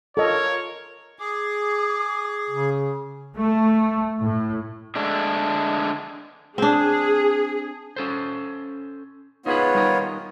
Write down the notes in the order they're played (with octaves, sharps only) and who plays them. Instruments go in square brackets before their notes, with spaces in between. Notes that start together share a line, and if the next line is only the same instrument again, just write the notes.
[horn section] F4 A#4 [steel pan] A4 D#5 [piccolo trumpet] C#5
[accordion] G#4 [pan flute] D6
[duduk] C#3
[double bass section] A3
A2
[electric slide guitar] D3 G#3 A3 D4
[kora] C4 D4 [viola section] G#4
[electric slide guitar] C#4 A4 C5
[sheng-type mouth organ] B3 F4 C#5 [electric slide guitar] D#4 G#4 B4
[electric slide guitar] G3 D#4 A#4